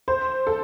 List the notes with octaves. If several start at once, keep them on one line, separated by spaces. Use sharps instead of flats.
C5
A4